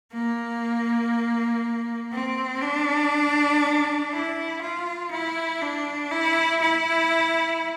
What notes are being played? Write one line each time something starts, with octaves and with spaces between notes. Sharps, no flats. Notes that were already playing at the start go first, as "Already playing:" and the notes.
A#3
C4
D4
E4
F4
E4
D4
E4
E4